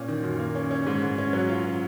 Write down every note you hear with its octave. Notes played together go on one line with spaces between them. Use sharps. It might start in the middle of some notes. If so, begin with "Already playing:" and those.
Already playing: A#2 C#4
D#3
F#2
A#3
C#4
C#4
G#2
G#2
C#4
F#3
F4
C#4